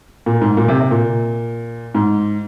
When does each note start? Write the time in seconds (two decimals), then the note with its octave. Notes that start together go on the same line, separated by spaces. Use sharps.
0.26 A#2
0.41 G#2
0.57 A#2
0.68 C3
0.80 C3
0.91 A#2
1.95 G#2